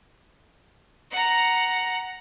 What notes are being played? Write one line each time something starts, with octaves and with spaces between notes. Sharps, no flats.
F#5 A#5